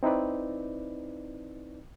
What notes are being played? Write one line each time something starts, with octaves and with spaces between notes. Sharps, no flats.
C4 D#4 E4 B4 D5